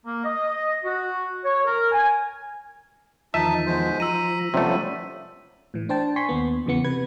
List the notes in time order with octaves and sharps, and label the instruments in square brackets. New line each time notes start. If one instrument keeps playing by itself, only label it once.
[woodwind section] A#3
D#5
F#4
C#5
A#4
G#5
[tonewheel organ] E2 D#3 F3 [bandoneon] D#4 A5 [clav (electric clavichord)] E5 [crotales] B6 D#7
[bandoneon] B2 G#3 C5
[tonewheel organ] F3 [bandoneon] A#5 [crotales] E6 D#7
[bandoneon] D#2 G3 B3 [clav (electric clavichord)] C3 A3 [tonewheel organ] F3 C#4
[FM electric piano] A2 E3
D4 C5 G5 A5
G#5 C6 C#6 B6
D#2 B3
E2 C#3 E3 B3 C#7
C3 B4 G#6